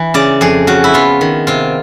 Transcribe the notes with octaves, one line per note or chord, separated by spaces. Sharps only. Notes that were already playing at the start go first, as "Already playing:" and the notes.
Already playing: E3
C#3 D5
F2 G#4
C#3 F#4
E4
B3 F4
D#3
C3 F4